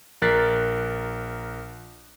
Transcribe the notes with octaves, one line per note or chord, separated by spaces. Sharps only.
A#1 A#4 F#6 A6 B6 C7